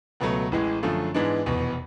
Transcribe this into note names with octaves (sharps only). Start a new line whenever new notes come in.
C#2 B2 F#3 A3
A1 A2 E3 G#3
F#2 D3 F3 A3
G#2 E3 G#3 B3 D4
F1 E2 B2